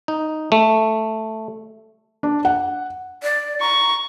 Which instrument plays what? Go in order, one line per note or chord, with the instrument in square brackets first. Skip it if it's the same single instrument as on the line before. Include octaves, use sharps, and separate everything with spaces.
[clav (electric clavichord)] D#4
A3
[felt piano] D4
F#5
[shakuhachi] D5
[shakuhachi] A#5 [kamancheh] C#6